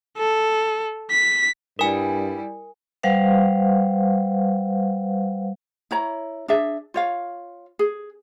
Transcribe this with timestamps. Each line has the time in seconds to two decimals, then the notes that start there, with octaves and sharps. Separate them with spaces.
0.18 A4
1.11 B6
1.79 G2 G3 E4 A#4 G#5
3.03 G3 B4 C5 F5 F#5
5.91 E4 C#5 A#5
6.48 D4 G#4 E5
6.94 F4 C#5 F5
7.79 G#4